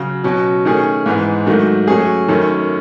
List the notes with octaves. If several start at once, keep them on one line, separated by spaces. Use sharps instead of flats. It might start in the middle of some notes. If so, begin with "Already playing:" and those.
Already playing: C#3 F#3
B2 F#3 C#4
D#3 A3 C#4 G#4
G#2 E3 G#3 B3
G#2 D#3 F#3 A3
F#3 A3 C#4 G#4
F#2 D#3 A3 C#4